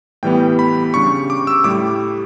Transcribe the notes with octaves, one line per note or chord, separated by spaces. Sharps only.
A2 E3 G3 B3 G5
B5
C#3 G3 D4 C#6
D6
E6
A2 G3 D6